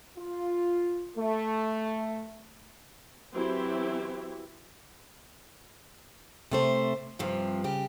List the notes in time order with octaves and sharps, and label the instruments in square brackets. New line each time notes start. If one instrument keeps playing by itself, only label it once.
[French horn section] F4
A3
[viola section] E3 F#3 C4 E4 G4 E5
[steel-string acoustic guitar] C3 A3 C5
G2 C3 F3
C#3 G4